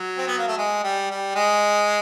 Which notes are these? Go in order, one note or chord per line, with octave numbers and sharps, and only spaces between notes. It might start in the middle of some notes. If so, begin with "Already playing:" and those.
Already playing: F#3
C4
B3
A#3
A3
G#3
G3
G3
G#3